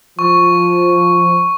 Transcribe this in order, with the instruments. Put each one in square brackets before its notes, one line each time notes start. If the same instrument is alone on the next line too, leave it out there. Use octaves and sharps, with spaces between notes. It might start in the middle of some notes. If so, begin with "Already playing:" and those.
[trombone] F3 [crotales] C#6